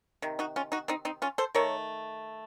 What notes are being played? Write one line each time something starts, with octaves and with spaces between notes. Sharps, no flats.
C3 D#3
D#4 F#4
C#4 F4
D#4 F#4
C4 D#4
C4 D#4
C#4 F4
A4 C5
D#3 A3 A#4 C#5